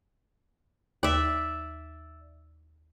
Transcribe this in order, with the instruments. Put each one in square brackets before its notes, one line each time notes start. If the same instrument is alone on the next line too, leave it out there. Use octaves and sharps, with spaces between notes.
[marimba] D#2 [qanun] D5 E5